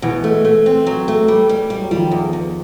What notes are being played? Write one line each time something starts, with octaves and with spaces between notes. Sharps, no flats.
B2 E3
A3
A3
C4
F#3
A3
G3
G3
G3
F#3
D#3 F3 G3
E2
E2